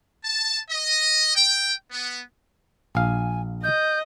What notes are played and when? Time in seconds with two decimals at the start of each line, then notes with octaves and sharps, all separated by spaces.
0.24 A5
0.70 D#5
1.36 G5
1.91 B3
2.95 A#1 F5 G#5
3.64 D#5 G6